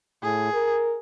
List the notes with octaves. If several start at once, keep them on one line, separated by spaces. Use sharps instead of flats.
A2 G#4
A#4